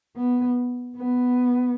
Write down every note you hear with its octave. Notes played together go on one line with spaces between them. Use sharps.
B3
B3